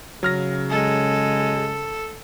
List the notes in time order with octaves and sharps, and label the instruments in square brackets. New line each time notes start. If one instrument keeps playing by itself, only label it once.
[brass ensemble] C#3 [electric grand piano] F#3 F6 A#6
[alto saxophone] G#3 [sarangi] A4